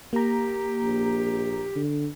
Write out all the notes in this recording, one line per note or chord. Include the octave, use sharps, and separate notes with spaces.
A#3 G4 A#5
A#1
D3